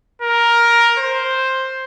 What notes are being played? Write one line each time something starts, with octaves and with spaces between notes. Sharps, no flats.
A#4
C5